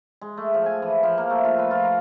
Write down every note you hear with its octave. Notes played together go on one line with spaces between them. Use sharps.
G#3
A3
F3
G#5
E3
F3
A#3
A3
F4
B4
F4
A#4